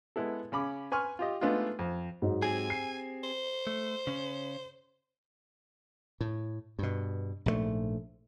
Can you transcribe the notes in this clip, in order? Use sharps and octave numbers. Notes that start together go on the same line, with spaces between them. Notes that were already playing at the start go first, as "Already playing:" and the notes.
G#3 B3 E4 A4
C#3 C#4 B5 D6
B4 G#5 C6 C#6 F6
F4 G4 D#5
G#3 A3 B3 D4 D#4 F4
F2
G#2 F#3 D#4
C4 G4 G#4 G#5
C7
C5
A3
C#3 C#4
A2
G2 B2
A#1 G#2 C#3 A3